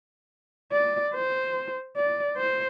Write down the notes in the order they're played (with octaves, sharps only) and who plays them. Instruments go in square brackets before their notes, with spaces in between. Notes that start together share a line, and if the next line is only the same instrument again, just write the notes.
[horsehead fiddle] D5
C5
D5
C5